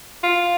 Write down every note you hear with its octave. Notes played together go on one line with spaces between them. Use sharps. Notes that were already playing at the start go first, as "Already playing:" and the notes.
F4